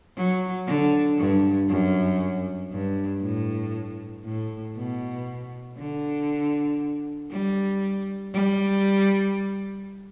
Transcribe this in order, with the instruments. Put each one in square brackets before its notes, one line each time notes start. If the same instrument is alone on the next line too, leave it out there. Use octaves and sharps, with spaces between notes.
[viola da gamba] F#3
D3
G2
F#2
G2
A2
A2
B2
D3
G3
G3